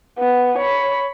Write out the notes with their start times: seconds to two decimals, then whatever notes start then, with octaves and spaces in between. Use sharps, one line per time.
0.19 B3
0.58 C#5 B5